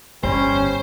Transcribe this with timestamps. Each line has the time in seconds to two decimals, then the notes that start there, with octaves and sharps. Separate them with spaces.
0.23 G1 G3 C#4 C5